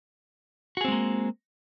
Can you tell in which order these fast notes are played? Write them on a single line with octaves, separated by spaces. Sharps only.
F#4 G#4 C4 G#3 A#3